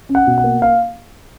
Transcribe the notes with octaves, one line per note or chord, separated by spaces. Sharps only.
C#4
F#5
B2
F#5
A#3
F5